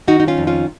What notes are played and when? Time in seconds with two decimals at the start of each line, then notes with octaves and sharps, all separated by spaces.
0.08 D#3 D#4 F#4
0.20 D#4
0.28 C#4 F4
0.37 F2
0.47 C#4 F4